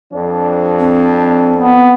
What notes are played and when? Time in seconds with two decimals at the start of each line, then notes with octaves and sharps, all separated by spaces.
0.12 F2 F3 D4
0.79 C4
1.56 B3